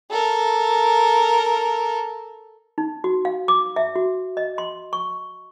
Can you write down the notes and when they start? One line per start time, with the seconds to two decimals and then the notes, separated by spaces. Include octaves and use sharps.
0.11 A4 A#4
2.78 D#4
3.04 F#4
3.25 F5
3.48 D6
3.76 E5
3.96 F#4
4.37 D#5
4.58 C6
4.93 C#6